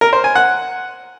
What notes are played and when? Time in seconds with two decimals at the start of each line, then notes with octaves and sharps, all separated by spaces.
0.01 A#4
0.13 C5
0.24 G#5
0.35 F#5